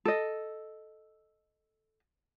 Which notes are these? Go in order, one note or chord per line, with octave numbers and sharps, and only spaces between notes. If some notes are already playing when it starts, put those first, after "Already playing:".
A4 D#5